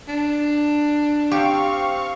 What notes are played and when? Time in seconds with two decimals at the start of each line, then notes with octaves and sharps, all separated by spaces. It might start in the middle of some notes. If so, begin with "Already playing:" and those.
0.08 D4
1.32 C4 G4 F5 C#6